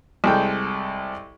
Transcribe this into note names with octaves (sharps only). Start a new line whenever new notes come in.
C2 G#3 A4 G5